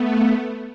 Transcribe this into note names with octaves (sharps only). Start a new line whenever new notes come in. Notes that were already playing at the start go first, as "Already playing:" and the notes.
Already playing: A3 B3